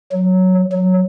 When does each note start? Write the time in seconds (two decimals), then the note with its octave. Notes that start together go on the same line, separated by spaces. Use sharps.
0.12 F#3
0.72 F#3